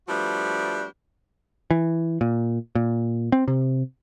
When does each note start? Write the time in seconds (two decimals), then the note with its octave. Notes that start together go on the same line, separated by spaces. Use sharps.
0.08 F3 G3 A3 B3 D4 F#4
1.71 E3
2.21 A#2
2.75 A#2
3.32 C4
3.48 C3